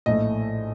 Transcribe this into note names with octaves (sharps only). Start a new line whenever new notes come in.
A#1 A2 A3 D#5